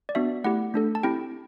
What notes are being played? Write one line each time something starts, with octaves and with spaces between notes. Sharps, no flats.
D5
B3 D4 F#4 E5
A3 E4 G4 F#5
A3 D4 A4
A5
C4 E4 G4 G5